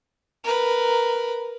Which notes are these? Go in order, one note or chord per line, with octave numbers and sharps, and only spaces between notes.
A#4 B4